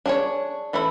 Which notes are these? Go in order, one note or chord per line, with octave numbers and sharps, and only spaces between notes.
D4 G#4 C#5
E3 A3 E4